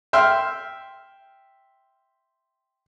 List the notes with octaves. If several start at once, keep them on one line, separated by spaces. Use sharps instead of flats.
E5 G5 C6 F6